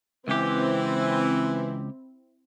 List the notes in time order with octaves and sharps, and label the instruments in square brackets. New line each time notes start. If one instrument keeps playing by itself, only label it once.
[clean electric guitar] C#2 G4 [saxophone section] E3 [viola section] C4 E4